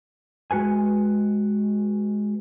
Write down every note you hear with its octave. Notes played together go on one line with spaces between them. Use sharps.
G#3 F#4 B4 G#5